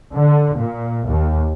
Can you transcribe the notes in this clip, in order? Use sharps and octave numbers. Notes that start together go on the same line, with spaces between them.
D3
A#2
D#2